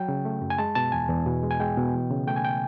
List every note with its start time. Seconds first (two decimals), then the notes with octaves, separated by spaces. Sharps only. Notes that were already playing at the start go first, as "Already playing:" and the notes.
Already playing: F#3 G5
0.09 C#3
0.25 A3
0.42 F#2
0.50 G#5
0.58 G#3 A5
0.75 B2 A5
0.92 E2 G#5
1.09 E2
1.26 B2
1.43 G#3
1.51 G#5
1.60 G#3 G5
1.77 B2
1.94 E3
2.10 C#3
2.27 A3 G5
2.36 G#5
2.45 G5